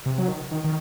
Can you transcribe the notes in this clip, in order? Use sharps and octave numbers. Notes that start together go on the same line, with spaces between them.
C3
F#3
D#3
D#3
D#3